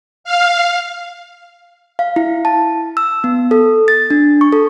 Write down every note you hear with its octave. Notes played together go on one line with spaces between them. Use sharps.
F5
F5
E4
A5
E6
B3
A4
A6
D4
C#6
A4